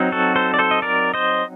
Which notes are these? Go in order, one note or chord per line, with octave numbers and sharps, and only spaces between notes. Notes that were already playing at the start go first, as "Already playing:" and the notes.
Already playing: F#3 C4 D#4
F#4 A4
A4 C5
D5
A4 C5
D#5
A#4 D5
C5 D#5